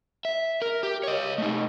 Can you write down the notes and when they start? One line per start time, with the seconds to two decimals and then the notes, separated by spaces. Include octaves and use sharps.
0.25 E5
0.62 A#4
0.83 G4
1.03 C#5 D#5
1.38 A3 D#4